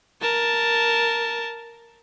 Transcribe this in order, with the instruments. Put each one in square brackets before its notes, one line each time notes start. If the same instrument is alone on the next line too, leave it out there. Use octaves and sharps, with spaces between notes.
[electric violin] A#4 A5